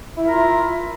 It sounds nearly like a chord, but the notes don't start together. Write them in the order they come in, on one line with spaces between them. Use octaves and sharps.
E4 E5 A#4 F4